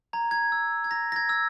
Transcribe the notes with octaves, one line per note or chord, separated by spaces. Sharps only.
A#5 G#6
G#6
E6
G#6
A#5 A#6
A#6
G#6
E6